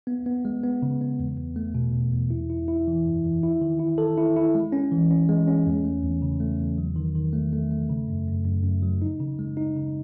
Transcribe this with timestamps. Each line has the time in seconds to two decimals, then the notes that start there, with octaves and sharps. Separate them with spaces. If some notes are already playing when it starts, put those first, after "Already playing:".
0.07 B3
0.26 B3
0.45 G#3
0.63 B3
0.82 C#3
1.01 B3
1.19 E2
1.37 E2
1.56 A3
1.75 B2
1.93 E2
2.13 E2
2.30 E4
2.50 E4
2.68 E4
2.87 E3
3.05 F#2
3.24 E3
3.43 E4
3.61 D#3
3.79 E4
3.98 A4
4.18 E4
4.36 E4
4.55 G#3
4.72 C#4
4.92 E3
5.11 C#4
5.29 G#3
5.47 C#4
5.66 E2
5.85 A3
6.03 E2
6.22 C#3
6.40 A3
6.60 E2
6.78 F#3
6.96 D#3
7.15 D#3
7.33 A3
7.53 A3
7.71 A3
7.89 C#3
8.08 F#2
8.27 F#2
8.45 F#2
8.64 F#2
8.83 F#3
9.02 D#4
9.20 C#3
9.39 G#3
9.57 D#4
9.76 C#3